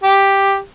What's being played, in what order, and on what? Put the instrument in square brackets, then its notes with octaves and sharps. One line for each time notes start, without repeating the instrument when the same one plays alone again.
[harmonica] G4